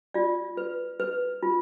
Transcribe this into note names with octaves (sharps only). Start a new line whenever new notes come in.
F4 D5
B4
B4
F4